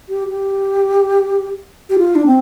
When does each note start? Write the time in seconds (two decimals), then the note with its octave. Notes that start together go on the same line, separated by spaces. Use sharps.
0.09 G4
0.29 G4
1.90 G4
1.98 F4
2.15 D4
2.26 C4